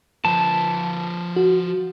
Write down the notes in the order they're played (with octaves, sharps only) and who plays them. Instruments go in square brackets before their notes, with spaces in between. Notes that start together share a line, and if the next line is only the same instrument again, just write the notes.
[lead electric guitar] F3 B4 [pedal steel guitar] A5
[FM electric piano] F#4